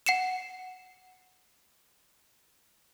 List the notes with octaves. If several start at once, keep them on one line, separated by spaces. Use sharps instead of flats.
F#5 C7 C#7 E7